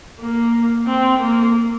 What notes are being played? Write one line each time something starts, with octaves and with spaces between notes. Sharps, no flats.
A#3
C4
A#3